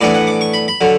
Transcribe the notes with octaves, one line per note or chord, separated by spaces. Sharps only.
A2 E3 B3 D4 D5
F#5
D6
C#6
B5
B5
D3 F#3